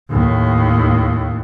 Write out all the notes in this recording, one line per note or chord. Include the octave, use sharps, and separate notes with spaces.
D#2 A2